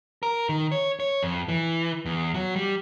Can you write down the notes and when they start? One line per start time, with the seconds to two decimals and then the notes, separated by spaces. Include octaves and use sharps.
0.23 A#4
0.49 D#3
0.72 C#5
1.00 C#5
1.23 F2
1.49 E3
2.06 E2
2.34 F#3
2.56 G3